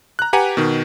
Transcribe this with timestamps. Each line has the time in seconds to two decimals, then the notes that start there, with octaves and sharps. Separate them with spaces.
0.19 A#5 F#6
0.33 G4 B4 F#5 G#5 A#5
0.57 B2 D#3